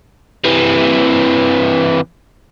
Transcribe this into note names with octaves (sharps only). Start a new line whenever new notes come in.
C3 E3